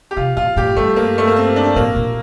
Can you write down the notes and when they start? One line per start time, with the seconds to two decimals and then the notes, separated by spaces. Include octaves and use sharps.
0.11 G4
0.17 C3 F4
0.37 A#2 F4
0.56 A2 G4
0.76 G2 A3
0.96 A#3
1.18 A3
1.27 A#3
1.36 C4
1.56 D4
1.76 A2 A#3
1.96 A#2